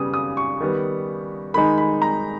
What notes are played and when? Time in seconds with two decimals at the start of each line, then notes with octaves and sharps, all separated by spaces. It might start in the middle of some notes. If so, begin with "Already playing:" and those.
Already playing: C#3 G3 B3 D#6
0.14 D#6
0.37 C#6
0.60 D#3 G3 B3
1.54 D#3 G#3 D#4 B5
1.78 B5
2.02 A#5